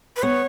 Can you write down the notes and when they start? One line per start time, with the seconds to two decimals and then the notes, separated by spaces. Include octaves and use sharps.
0.16 B4
0.22 B3 C#5